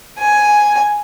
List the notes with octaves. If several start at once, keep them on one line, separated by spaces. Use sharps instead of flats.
G#5